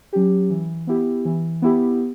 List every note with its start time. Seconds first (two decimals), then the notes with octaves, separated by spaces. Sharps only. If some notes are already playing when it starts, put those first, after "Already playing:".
0.13 F#3 C#4 G4
0.50 E3
0.87 B3 E4 G4
1.25 E3
1.62 B3 E4 G4